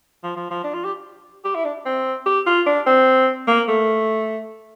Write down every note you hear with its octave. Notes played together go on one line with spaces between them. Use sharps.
F3
F3
F3
D4
F4
G4
G4
E4
D4
C4
G4
F4
D4
C4
A#3
A3